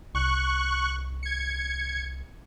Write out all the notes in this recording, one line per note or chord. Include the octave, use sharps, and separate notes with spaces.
C2 C#6 F#6
G#6 C#7